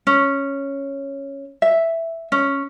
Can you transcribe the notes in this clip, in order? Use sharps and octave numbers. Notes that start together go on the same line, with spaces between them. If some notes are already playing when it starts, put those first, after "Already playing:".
C#4
E5
C#4